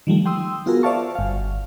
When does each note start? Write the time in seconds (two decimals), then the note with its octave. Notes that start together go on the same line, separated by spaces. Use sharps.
0.07 D#3 F3 G3 A3
0.26 G5 C6 D#6 E6
0.66 B3 F4 F#4 G#4 A#4
0.83 C5 D5 E5 F5 A5 C#6
1.15 G1 F5